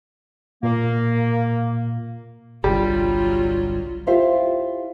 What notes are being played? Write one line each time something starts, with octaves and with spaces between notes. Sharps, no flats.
A#2 A#3
G1 C2 G2 F#3 G3 F4
E4 F4 G4 C5 E5 F5